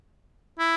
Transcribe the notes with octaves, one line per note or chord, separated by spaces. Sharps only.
E4